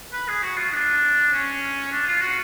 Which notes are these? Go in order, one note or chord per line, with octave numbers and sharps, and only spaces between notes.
B4
G#4
F#4
F4
D4
C#4
D4
F4
F#4